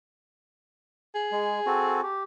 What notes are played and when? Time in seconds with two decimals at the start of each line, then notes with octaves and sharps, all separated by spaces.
1.15 G#4
1.32 G#3
1.66 C4 F#4 A4
2.03 G4